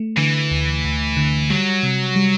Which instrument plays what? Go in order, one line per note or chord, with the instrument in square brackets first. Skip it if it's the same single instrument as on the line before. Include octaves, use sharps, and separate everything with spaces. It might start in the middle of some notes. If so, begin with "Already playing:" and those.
Already playing: [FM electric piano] A3
[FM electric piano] D3 [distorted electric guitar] E3
[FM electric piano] D2
D2
D3
[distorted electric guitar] F#3 [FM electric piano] G3
[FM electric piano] C3
G3